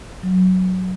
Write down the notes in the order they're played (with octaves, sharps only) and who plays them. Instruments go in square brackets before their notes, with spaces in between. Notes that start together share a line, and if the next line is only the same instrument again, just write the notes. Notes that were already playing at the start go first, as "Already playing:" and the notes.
[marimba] F#3